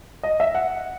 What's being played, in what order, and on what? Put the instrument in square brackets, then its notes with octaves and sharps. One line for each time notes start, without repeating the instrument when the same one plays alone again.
[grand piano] D#5
E5
F#5